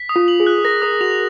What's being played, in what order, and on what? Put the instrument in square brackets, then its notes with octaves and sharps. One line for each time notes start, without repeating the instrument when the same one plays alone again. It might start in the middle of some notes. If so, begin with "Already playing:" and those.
Already playing: [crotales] B6
D#6
[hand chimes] F4
[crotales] F#7
[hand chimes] G#4
[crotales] F#6
[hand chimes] G#4
[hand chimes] A#4 [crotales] A#6
[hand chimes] A#4 [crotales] D#6
[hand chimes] G#4
[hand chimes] F#4 [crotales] F7